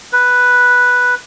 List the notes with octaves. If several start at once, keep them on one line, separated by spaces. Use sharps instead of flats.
B4